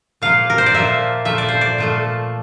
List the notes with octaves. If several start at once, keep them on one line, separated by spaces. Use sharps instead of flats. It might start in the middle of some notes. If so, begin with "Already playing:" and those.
A#2 F3 A#3 F5
A#4
C5
D5
A#2 F3 A#3 E5
A#2 F3 A3 E5
D5
C5
D5
A#2 F3 A3